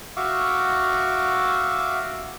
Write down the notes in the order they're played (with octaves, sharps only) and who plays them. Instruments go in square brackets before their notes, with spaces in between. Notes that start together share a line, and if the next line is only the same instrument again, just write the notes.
[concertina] F#4 E5 F5 C#6 D6